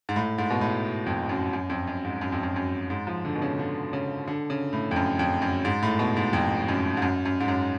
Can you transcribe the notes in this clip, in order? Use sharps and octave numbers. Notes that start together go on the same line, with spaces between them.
G#2
A2
G#2
B2
A2
F2
F#2
F#2
F2
F#2
G#2
F#2
F2
F#2
F#2
G#2
F3
D3
B2
C#3
D3
C#3
D3
C#3
A2
F2
F#2
F2
F#2
G#2
A2
B2
G#2
F2
F#2
G#2
F#2
F#2
G#2
F#2